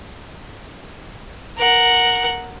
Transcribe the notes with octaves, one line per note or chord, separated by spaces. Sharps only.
A#4 F#5